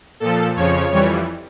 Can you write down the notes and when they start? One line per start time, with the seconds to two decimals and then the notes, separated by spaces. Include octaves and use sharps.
0.20 A#2 F3 A4
0.56 F2 C#3 F3 C#5
0.91 F2 E3 G3